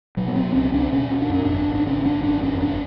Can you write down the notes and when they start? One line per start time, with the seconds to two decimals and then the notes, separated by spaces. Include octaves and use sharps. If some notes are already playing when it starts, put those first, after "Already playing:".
0.17 B2 F#3
0.28 B3
0.36 B2 C4
0.55 C#2 C#4
0.73 C#2 D4
0.92 B2 C#4
1.11 B2
1.22 D4
1.30 F#2 C#4
1.45 G#1 D4
1.68 G#1
1.75 D4
1.87 C#3 C#4
2.05 F#2 D4
2.24 G#1 D4
2.43 F2 C#4
2.61 F#1 D4